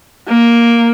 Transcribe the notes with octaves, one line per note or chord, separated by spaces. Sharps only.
A#3